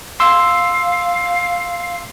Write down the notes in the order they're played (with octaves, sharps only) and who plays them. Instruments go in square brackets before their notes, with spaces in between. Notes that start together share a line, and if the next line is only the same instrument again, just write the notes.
[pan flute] F5 [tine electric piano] C6 E6